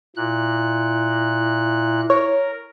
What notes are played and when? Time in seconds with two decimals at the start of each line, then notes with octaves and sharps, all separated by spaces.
0.17 A#2 E4 F#6
2.10 A#4 C#5